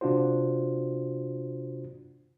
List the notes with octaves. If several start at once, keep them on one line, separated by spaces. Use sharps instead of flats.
C3 D4 F4 F#4 C5